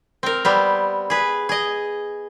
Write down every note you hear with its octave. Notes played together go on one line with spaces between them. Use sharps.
C4 A#4
G3 B3 C4
G#4 B4
G#4 D#5